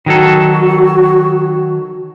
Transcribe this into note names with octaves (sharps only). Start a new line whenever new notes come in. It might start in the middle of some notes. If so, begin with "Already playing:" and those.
D#3 F#3 F#4 A4